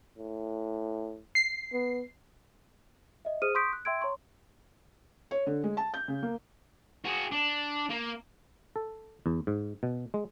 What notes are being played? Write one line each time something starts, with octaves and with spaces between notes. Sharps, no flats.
A2
C7
B3
D#5 E5
G#4 C5 D#6 F6 D#7
C6 C#6 D#6 G6 B6 D7
F#6
E5 G5 C6 E6 G#6 D7
C#5 A#5 C6 C#6
C#5
D3
G#3
A5
G6
C#3
A#3
F#4 G#4
D4
A#3
A4
E2
G#2
B2
G#3